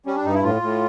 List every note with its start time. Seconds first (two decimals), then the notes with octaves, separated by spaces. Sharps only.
0.06 G3 C#4
0.16 D4
0.25 G2 D#4
0.34 E4
0.43 A2 F4
0.62 A2